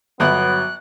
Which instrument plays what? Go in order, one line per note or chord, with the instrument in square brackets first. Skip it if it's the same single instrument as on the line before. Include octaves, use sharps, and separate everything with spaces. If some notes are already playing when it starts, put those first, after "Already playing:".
[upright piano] G1 [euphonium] F#3 [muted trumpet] B3 [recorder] F#6